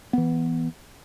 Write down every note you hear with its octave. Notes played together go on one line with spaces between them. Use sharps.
E3 B3